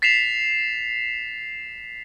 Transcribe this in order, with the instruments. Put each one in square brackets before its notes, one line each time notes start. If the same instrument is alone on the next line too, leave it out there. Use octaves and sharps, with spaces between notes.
[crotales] A6 B6 C7 E7 F7